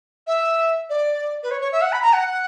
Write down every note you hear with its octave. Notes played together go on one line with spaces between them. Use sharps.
E5
D5
B4
C#5
C#5
E5
F#5
B5
A#5
F#5